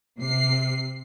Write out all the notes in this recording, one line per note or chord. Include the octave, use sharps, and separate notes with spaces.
C3 C7